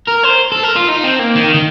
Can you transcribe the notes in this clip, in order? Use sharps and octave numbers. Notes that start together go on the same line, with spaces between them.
A#4
C5
A4
A#4
F4
D#4
C4
A#3
D#3
D#3